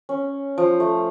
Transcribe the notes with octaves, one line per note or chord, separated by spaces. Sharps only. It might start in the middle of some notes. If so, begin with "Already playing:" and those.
C#4
F3
A3